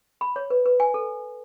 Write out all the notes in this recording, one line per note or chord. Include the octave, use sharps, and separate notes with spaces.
B5
C#5
B4
B4
G#5
A4